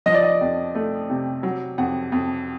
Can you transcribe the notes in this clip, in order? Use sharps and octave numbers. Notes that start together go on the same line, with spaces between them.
F3 D#5
D5
D#5
F2
A3
C3
F#3
F2 F#5
F2